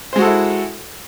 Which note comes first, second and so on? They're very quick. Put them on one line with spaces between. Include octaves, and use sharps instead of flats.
C5 G#3 F#4 A4 E4